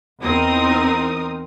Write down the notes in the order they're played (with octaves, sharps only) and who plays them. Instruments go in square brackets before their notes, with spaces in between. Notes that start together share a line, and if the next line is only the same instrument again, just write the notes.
[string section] E2 C4 D#4 A#4 D#6